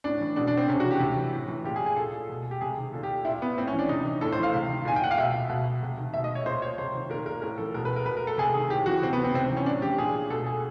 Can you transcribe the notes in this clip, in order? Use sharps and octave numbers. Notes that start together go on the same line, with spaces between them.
A2 D4
E3
B2 D4
D4
C4
C3 C#4
F#4
E3
G4
C3
E3
A2
E3
A#2 G4
G#4
G#4
A#2 A4
B2
G4
C3 G#4
D#3
A#2 A4
G4
A#2 E4
B3
A2 C4
C#4
E3
D4
C3 D#4
E3
A2 A4
C5
E3
F5
C3
D#3
A#2 G#5
G5
F#5
F5
B2 E5
B2
C3
D#3
B2 E5
D#5
C#5
A#2 C5
C#5
C3 C5
D#3
A#2 A#4
A#4
A2 A#4
E3 A4
B2 A#4
B4
A#4
B2 B4
A#4
A4
C3 G#4
D#3 G#4
A2 G4
E3 F#4
C3 C4
B3
D#3
C4
C3 C4
C4
E3
C#4
A2 D4
E3 G4
A#2 G#4
B2 A4
G#4